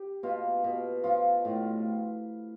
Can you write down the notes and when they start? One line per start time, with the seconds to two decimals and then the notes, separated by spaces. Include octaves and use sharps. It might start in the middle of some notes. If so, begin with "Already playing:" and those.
Already playing: G4
0.23 B2 F4
0.64 B2
1.04 F3 F4
1.45 A2